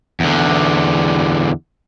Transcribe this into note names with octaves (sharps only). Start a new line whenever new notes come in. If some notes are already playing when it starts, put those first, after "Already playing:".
E2 D3